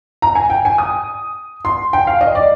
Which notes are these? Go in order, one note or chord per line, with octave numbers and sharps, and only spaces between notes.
A#5
G#5
G5
G#5
D#6
C6
G5
F5
D#5
D5